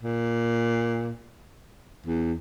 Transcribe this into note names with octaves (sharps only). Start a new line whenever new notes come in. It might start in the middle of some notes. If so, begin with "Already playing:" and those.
A#2
E2